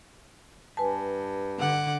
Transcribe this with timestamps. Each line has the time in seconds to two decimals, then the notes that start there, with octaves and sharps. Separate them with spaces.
0.77 G2 B4 G#5 A5
1.59 D3 F#5 D6